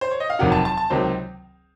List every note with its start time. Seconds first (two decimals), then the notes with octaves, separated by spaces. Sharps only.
0.01 C5
0.11 C#5
0.20 D#5
0.30 F5
0.39 F1 F2 C3 D#3 F#3 F#5
0.52 A5
0.65 A5
0.77 A5
0.90 C#2 C3 D#3 F#3 C5